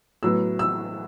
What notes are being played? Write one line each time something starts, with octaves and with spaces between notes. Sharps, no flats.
A2 F#3 B3 E6
E6